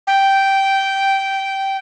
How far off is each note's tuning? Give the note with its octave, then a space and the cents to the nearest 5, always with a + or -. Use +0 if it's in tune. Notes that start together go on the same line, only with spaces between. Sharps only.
G5 -10